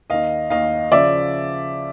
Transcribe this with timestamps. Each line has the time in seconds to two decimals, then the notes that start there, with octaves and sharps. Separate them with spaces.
0.10 D#2 D#3 D#5 F5
0.50 D#2 D#3 D#5 F5
0.91 C#3 F3 D5 E5